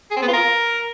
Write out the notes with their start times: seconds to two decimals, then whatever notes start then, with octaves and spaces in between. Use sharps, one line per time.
0.11 G#4
0.16 C4
0.22 B3
0.28 F4
0.34 A#4